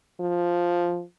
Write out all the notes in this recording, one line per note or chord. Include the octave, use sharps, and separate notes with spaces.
F3